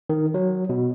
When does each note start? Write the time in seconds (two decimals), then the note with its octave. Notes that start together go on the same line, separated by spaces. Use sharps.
0.10 D#3
0.34 F#3
0.69 B2